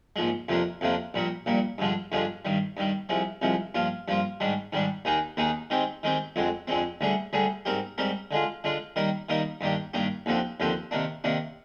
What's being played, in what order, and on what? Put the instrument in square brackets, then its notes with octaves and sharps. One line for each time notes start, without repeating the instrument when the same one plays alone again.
[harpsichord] A#1 G#2 F3 G#3
F2 C3 F3 A#3 D4
F2 C3 F3 A#3 D4
A#1 A#2 G3 A#3
A#1 A#2 G3 A#3
G2 D3 F3 G#3 D4
G2 D3 F3 G#3 D4
G2 D#3 G3
G2 D#3 G3
C2 C3 F3 G#3
C2 C3 F3 G#3
G2 F3 A#3 F4
G2 F3 A#3 F4
G#2 D#3 G3 D4
G#2 D#3 G3 D4
D#2 D#3 A#3 D#4 G#4
D#2 D#3 A#3 D#4 G#4
D#3 G#3 C4 G4
D#3 G#3 C4 G4
F2 D3 G#3 C4
F2 D3 G#3 C4
D2 D3 G3 D4 G#4
D2 D3 G3 D4 G#4
G#2 G3 C4 G4 A#4
G#2 G3 C4 G4 A#4
D3 G#3 D4 F4
D3 G#3 D4 F4
D#3 G3 A#3 D#4 A#4
D#3 G3 A#3 D#4 A#4
G2 D#3 A#3 D4 G4
G2 D#3 A#3 D4 G4
D#2 D3 F3 C4 G4
D#2 D3 F3 C4 G4
C3 D#3 A#3 D4
C3 D#3 A#3 D4